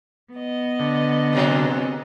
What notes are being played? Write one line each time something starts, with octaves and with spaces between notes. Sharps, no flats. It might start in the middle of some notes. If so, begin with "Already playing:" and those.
B3 D#5
D3
G#2 C3 F#3